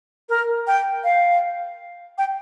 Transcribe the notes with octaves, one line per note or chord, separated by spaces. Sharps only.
A#4
G5
F5
G5